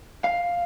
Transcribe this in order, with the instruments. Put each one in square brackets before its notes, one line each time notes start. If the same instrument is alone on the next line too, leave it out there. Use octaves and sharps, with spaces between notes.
[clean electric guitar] F5